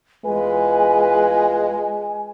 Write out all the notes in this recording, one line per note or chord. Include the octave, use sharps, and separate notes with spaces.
E2 G#3 F4 B4 G#5